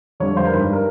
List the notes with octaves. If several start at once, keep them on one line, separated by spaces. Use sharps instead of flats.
F2 D3 G3 C#5
C5
A#4
G2 D#3 G3 B4
A#4